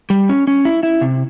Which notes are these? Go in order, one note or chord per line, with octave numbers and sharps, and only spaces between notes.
G3
C#4
C#4
E4
E4
C3